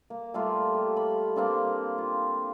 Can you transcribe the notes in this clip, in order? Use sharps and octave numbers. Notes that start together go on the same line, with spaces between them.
A#3
G3 A3 A#3 F4
G4
B5
A#3 C4 D4
F4